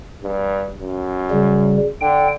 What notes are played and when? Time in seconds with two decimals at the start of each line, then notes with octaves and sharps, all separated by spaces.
0.23 G2
0.81 F#2
1.31 C#3 G3
2.01 D3 G5